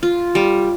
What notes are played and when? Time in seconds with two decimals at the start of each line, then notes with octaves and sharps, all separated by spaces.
0.03 F4
0.35 G3